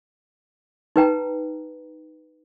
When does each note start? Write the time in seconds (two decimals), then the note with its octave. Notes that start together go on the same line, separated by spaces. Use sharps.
0.96 D#4 B4 G5 A#5